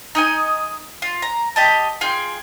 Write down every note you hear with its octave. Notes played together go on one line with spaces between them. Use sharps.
D#4 D#5 G#5
F4
A#5
G4 D#5 A5
F4 G#4 G5 C6